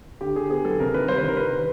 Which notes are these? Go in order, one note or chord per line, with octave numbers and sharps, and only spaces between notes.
D3 G4
D3 G#4
B3 G#4
F#3 A4
C3 A#4
D#3 B4
G3 C5
B4
D#3 A#4
D#3 B4
D#3